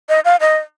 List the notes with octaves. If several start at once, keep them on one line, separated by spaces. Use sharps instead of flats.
D#5
F5
D#5